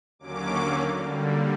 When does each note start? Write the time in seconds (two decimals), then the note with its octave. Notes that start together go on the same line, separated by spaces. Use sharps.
0.19 D#2 D3 F#3 A#3 C#4 D6
0.97 D3 G3 A#3